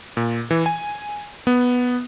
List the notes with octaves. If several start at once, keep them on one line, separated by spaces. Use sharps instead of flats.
A#2
E3
G#5
B3